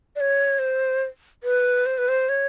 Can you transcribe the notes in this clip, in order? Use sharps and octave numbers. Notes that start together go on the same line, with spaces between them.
D5
C#5
C5
B4
C5
B4
C5
C#5